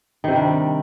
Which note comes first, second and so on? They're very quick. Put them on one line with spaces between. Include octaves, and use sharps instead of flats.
D#3 C3 G3 D4